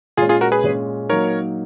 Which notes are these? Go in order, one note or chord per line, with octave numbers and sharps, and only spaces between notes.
A#2 G#3 C#4 F4 G#4
F4 G#4
F#4 A#4
G#4 B4
A#2 G#3 C#4
F#3 A#3 D#4 A#4 C#5